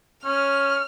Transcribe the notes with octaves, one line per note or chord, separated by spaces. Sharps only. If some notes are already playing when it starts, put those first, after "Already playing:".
C#4 F6